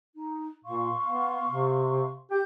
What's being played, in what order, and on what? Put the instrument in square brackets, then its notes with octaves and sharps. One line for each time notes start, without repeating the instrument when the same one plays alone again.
[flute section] D#4
[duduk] A#2 [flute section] F5 C6 C#6
[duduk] B3
C3
[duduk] G4 [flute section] G6